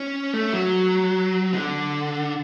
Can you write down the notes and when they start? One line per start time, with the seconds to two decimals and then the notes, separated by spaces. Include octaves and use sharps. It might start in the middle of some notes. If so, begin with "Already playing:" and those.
Already playing: C#4
0.33 A3
0.53 F#3
1.53 D3